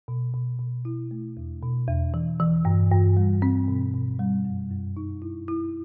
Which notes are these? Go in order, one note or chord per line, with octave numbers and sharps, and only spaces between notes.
B2
B2
B2
E4
A3
E2
B2
E2
E3
E3
G2
G2
G3
C4
B2
B2
G3
F#2
F#2
D#4
E4
E4